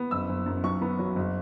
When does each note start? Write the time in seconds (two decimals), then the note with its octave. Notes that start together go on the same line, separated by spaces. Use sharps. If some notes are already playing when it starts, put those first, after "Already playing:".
Already playing: B3
0.11 F#1 E6
0.29 F#1
0.46 F#2
0.64 B1 C#6
0.82 B3
0.99 F#3
1.16 F#1